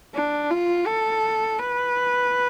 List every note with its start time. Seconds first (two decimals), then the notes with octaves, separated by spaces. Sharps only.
0.14 D4
0.51 F4
0.87 A4
1.59 B4